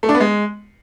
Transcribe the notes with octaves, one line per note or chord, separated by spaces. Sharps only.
A3
D4
B3
G#3